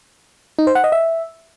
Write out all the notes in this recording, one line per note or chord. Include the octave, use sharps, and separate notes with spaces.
D#4
C5
F#5
D#5
E5